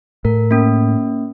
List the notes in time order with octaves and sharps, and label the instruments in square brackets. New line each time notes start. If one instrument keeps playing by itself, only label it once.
[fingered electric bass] A2 [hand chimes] A#4
[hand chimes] A#3 C#4